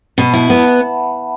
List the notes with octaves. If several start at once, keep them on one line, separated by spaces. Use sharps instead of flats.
B2 B5
E4 A5
B3 F#5
E5 A5